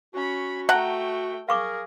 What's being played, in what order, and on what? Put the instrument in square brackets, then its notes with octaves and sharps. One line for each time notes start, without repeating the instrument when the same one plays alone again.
[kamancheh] C#4 B5 [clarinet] F#4
[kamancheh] A3 G5 [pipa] F#5 A#5 [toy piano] A5
[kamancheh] G#4 [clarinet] A#4 [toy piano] F5 C#6 D6